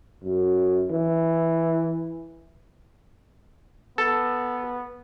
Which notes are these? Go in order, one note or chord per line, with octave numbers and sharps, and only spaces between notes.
F#2
E3
B3 A4